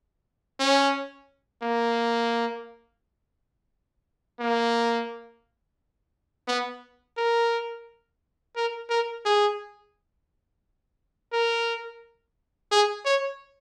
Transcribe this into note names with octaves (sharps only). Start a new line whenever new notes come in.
C#4
A#3
A#3
B3
A#4
A#4
A#4
G#4
A#4
G#4
C#5